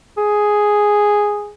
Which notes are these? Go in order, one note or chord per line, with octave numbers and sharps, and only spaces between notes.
G#4